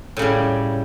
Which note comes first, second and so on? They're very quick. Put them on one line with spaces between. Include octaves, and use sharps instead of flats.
A2 C#3 G3